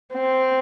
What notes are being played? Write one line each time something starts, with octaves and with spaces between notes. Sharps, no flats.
C4